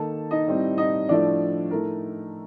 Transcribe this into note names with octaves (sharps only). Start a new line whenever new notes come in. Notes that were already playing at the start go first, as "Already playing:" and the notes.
Already playing: D#3 A#3 D#4 A4 A5
D#4 D#5
A2 G3 C4
D#4 D#5
A2 F3 A3 D4 D5
A2 A3 D#4 A#4